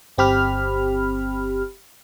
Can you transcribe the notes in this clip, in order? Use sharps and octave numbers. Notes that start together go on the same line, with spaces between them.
G1 C4 G4 B5 F6